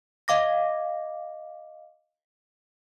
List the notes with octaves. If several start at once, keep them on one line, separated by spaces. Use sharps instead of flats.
D#5 F5 D6 A#6